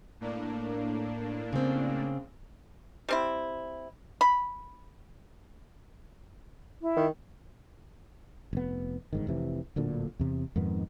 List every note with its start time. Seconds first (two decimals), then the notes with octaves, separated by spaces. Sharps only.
0.20 A2 A#3 D4
1.53 C#3 C4
3.09 G3 C4 E4
4.21 B5
6.82 E4
6.96 D#3
8.53 F1 B3
9.13 G1 G#2 D#3
9.27 F1 C3 E3
9.76 D1 D2 A#2 D3
10.19 E2 C3
10.56 F2 G#2 D#3 B3